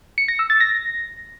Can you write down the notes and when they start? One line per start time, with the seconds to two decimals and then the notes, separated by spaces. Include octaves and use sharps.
0.18 C#7
0.28 A#6
0.39 E6
0.50 A6
0.60 A#6